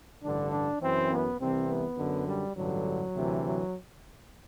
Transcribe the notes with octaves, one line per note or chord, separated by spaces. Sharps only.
A1 G2 D3 D4
D4
F#2 E3 C4
B3
C2 C3 E3 C4
B3
F#2 D3
G3
A1 G2 D3 F#3
D2 C3 E3
F#3